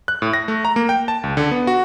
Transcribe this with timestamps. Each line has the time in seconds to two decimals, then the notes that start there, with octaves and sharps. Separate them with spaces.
0.08 F#6
0.22 A2
0.33 A#6
0.48 A3
0.65 A#5
0.76 A#3
0.89 G5
1.08 A5
1.24 C#2
1.37 D3
1.51 B3
1.67 F#4